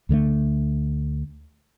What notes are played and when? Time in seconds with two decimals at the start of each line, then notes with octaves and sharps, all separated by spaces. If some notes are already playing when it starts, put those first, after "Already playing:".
0.09 D2 D3 G#3 A3